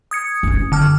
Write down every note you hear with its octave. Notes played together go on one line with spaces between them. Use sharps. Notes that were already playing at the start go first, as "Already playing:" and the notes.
D#6 G#6 C#7
F#1 C#4
D3 A5 F6